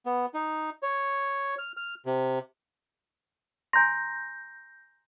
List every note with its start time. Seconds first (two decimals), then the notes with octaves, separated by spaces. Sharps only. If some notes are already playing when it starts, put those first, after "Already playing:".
0.06 B3
0.34 D#4
0.83 C#5
1.59 F6
1.77 F6
2.06 C3
3.73 G#5 A#5 C6 G6 A#6